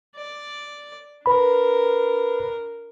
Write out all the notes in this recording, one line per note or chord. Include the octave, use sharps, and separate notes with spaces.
D5
D4 A#4 B4 B5